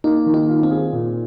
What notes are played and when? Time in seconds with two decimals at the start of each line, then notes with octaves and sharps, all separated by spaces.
0.04 A#3 D#4
0.26 D#3
0.34 D#4
0.49 F4
0.63 C4
0.71 G#4
0.93 A#2